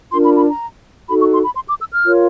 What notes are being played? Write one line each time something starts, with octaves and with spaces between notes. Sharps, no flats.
D4 F4 A#4 C6
B5
B5
A#5
D#4 F#4 A4 B5
C#6
C6
B5
C6
D6
E6
F6
F4 A#4 C#5